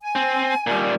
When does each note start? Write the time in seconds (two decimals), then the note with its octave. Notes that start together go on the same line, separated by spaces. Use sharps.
0.01 G#5
0.15 C4
0.67 A#2 G3